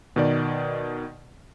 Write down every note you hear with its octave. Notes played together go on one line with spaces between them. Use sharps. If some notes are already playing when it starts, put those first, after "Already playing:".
B2 D#3 D5